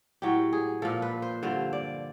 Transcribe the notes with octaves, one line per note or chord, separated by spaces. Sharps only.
A2 F#3 G4
G#4
A#2 F3 A4
B4
C5
G2 D3 F3 C5
D5